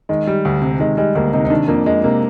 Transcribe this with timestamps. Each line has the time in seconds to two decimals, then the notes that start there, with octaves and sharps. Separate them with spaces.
0.09 D#3 G#3
0.27 G3
0.45 D2
0.62 C3
0.80 D#3 G#3
0.97 G3 G#3
1.15 D2 A#3
1.33 C3 D#4
1.45 D#4
1.50 D#3 D4
1.68 F2 A#3
1.86 F2 G#3
2.03 C3 A#3